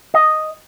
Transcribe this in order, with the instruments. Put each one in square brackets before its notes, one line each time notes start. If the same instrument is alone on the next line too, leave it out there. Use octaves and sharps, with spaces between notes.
[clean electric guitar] D#5